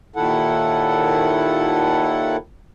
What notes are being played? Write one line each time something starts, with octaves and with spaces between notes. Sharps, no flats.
D#2 A#2 D#3 E4 A4 F#5